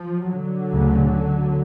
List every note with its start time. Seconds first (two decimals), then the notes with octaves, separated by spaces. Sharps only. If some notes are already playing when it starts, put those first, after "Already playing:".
Already playing: F3
0.28 D3 F#3
0.70 D2 C#3